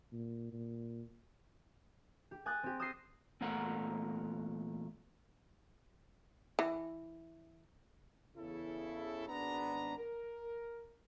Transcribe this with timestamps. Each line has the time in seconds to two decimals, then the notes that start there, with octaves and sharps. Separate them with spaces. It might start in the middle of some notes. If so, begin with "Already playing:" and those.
0.12 A#2
0.53 A#2
2.31 G4
2.46 G#5 D#6 F#6 G6 A6
2.63 C4 G4
2.80 D#6 E6 G6 A6 A#6 C7
3.41 E2 A#2 A3 A#4 F#5
6.59 E3
8.36 E2 C#3 E4 A4
9.28 G#1 B3 D4 A#5
9.98 A#4